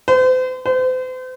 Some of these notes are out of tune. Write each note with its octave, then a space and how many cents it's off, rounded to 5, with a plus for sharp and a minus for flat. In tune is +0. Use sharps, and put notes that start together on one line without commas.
C5 -40
C5 -40